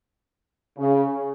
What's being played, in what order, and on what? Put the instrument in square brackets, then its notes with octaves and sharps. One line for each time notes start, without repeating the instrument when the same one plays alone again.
[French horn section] C#3